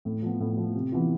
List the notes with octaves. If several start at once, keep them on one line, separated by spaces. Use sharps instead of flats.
A2
F3 B3
A2
F3 B3
C3
E3 B3 F4